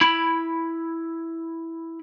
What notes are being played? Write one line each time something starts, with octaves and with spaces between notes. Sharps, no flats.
E4 B5